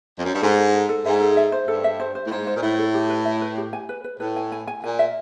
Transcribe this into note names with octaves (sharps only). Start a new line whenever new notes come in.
F2
F#2
G2
G#2 A4
A4
A4
A4
G#2 E5
A4
E5
C5
G2 A4
E5
C5
C5
A2
G#2 C5
C5
A#2
A2 E5
A4
G4
B4
E5
B4
G4
G#5
B4
B4
A2 B4
G#5
G#5
G#5
A#2 G#5
E5